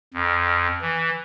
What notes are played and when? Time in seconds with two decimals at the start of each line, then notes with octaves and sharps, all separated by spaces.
0.14 F2
0.81 E3